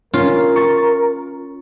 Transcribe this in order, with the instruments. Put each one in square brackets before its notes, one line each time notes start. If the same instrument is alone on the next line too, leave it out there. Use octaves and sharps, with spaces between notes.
[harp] C#4 [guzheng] F4 [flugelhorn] A#4
[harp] C#6 A6